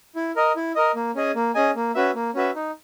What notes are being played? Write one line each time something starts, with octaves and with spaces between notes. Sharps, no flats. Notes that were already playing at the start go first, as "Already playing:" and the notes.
E4
A#4 D#5
E4
A#4 D#5
A#3
C#4 G#4 D#5 G#5
A#3
C#4 G#4 D#5 G#5
A#3
C#4 F#4 B4 E5
A#3
C#4 F#4 B4 E5
D#4